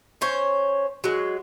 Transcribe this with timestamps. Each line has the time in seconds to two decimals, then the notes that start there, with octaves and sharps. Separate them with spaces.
0.21 C#4 C5 C#5
1.04 F#3 G#3